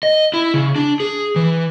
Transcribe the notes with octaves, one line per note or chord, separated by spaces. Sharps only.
D#5
E4
C#3
D4
G#4
E3